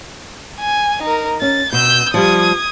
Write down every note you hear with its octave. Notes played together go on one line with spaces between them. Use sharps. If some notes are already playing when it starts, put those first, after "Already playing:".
G#5
D#4 A#4
C#4 A6
B2 E6 G6
F3 G3 D#6 G#6